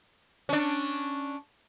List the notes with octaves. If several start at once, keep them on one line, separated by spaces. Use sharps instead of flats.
C#4 D4